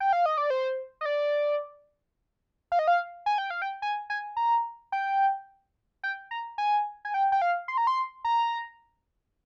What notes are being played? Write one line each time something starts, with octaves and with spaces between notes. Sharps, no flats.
G5
F5
D#5
D5
C5
D#5
D5
F5
D#5
F5
G#5
G5
F5
G5
G#5
G#5
A#5
G5
G5
A#5
G#5
G#5
G5
G5
F5
C6
A#5
C6
A#5